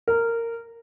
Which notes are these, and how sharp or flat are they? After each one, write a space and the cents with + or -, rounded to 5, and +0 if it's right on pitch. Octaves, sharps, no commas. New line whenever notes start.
A#4 -15